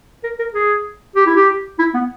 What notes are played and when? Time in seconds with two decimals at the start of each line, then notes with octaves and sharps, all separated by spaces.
0.24 A#4
0.39 A#4
0.54 G#4
1.16 G4
1.26 E4
1.36 G4
1.79 E4
1.94 B3